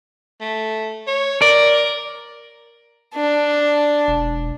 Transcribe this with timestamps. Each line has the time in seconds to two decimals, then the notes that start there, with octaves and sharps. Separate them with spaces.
0.41 A3
1.07 C#5
1.42 A#4 D5
3.14 D4
4.08 E1